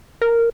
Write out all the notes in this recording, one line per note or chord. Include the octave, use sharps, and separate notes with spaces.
A#4